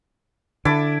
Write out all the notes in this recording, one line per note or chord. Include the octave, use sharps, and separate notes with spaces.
D3 E4 A5 D6